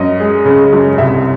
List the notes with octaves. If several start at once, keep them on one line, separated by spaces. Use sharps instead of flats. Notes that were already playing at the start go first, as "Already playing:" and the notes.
Already playing: F#2 D#5
G#3
C#3
F#2
C2 E5